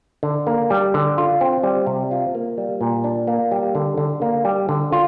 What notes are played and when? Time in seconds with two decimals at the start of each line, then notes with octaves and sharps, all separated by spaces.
0.23 D3
0.47 A#3
0.70 G3
0.94 D3
1.18 F4
1.41 C4
1.63 G3
1.87 C3
2.11 F4
2.35 A#3
2.58 G3
2.81 A#2
3.04 D4
3.27 A#3
3.52 G3
3.75 D3
3.98 D3
4.22 A#3
4.45 G3
4.69 D3
4.92 F4